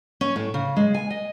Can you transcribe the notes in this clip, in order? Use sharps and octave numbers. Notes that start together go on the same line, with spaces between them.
C#4
A2
C#3
G#3
G#5
D#5